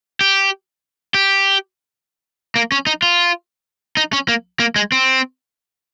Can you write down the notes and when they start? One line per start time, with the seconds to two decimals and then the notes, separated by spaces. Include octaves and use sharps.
0.21 G4
1.14 G4
2.56 A#3
2.72 C#4
2.87 D#4
3.02 F4
3.97 D#4
4.13 C#4
4.28 A#3
4.60 A#3
4.76 G#3
4.92 C4